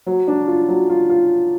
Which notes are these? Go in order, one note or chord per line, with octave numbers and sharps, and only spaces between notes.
F#3
D4
F4
F#3
F4
F4